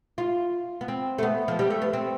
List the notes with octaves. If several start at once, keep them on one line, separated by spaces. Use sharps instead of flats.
F4
B3
C4
A3
B3
F3
G3
A3
B3
C4